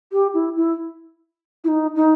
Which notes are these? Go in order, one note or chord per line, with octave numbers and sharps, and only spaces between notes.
G4
E4
E4
E4
D#4
D#4